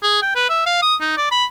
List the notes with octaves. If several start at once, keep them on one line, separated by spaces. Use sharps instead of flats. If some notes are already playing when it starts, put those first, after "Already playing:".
G#4
G5
B4
E5
F5
D#6
D#4
D5
B5